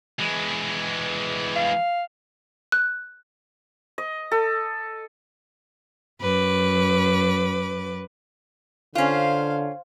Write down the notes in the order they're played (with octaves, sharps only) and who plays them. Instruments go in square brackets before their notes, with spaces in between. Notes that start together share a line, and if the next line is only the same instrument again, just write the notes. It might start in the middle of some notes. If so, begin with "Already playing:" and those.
[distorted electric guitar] E3 G#3
[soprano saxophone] F5
[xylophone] F#6
[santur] D#5
A4
[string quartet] F#2 B4 D6
[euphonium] D3 [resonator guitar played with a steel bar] C#4 F4 [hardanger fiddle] C5 F5